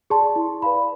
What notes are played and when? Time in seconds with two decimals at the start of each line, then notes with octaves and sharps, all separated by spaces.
0.10 G#4 D5 A5 C6
0.36 E4
0.62 B4 D5 F5 B5